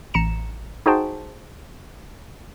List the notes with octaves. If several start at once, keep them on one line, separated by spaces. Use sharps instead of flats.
A1 A#5 C#7 E7
D#4 F#4 G#4 C5 G5 A5